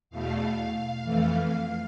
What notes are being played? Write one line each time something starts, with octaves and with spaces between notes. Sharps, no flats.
E2 B2 A3 F5
F2 E3 A3